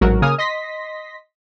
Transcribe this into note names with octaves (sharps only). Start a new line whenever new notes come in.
A1 G#2 F#3 F#4 A#4
C#3 A#3 G#5 D#6 F6
D#5 C6 A#6 B6